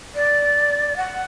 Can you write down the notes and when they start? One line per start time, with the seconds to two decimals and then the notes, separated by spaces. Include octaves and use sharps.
0.15 D5
0.97 F#5